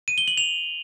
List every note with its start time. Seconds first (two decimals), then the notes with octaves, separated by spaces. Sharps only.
0.08 D#7
0.18 G7
0.28 F#7
0.38 F7